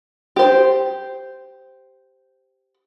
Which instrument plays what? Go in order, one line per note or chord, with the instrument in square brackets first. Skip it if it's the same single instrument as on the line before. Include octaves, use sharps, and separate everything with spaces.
[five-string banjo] G4 C5